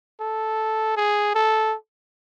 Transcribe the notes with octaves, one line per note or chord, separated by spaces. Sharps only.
A4
G#4
A4